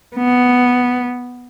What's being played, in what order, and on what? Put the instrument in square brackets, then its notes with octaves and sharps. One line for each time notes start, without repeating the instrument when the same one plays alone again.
[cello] B3